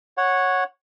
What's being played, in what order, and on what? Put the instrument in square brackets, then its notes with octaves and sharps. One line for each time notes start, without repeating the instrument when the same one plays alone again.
[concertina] C#5 F#5